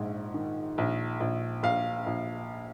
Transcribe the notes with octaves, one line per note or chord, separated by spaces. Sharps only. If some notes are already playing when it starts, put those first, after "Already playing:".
Already playing: A#1 G#2
D#3
A#1
A#1
A#1 F5
A#1